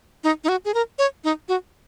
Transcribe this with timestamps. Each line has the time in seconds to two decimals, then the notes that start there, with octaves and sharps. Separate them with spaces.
0.24 D#4
0.44 D#4
0.49 F#4
0.65 G#4
0.74 A#4
0.99 C#5
1.24 D#4
1.48 F#4